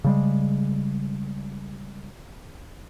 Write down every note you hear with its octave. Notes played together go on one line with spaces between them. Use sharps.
C#3 G3 G#3